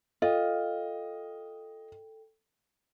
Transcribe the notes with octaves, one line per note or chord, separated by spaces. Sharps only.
F4 A4 D#5 G5